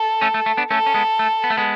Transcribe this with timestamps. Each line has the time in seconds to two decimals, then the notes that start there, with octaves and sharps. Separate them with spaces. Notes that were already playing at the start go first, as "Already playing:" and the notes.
Already playing: A4
0.21 A3 C#4
0.34 A3
0.46 A3
0.57 B3 D4
0.71 A3 C#4 A4
0.86 C#4
0.94 G#3 B3
1.19 A3
1.44 B3
1.50 A3
1.57 G#3 B3